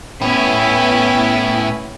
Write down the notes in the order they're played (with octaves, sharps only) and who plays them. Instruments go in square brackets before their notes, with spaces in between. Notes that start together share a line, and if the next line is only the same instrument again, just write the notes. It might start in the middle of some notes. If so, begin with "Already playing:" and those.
[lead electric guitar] A2 [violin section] B3 C#4 E4